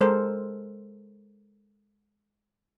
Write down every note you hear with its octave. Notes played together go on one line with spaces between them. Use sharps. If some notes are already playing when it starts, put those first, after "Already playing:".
G#3 A4 A#4 C5